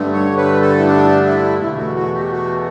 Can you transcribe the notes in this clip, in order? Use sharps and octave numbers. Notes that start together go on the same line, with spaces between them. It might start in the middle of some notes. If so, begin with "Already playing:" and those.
Already playing: G2 D3 A3
C#5
B4
A4
E4
D4
E4
E2 B2 A3 E4
F#4
F#4
G4
F#4